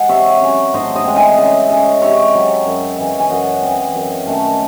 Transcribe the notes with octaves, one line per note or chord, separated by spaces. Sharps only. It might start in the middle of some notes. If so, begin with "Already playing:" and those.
Already playing: G#3 F#5 G#5
C3 C#5 E5
F#3 C#4
A2 C5 D#5
C5 D#5
G#3 C4
E5 G#5
C#3
G#3 C#4
C3 C#5 E5
F#3 C4
F#2
C#3 E3
G#5
F#2 D#5 F#5
E3 C4
F#2
D#3 A3 C#4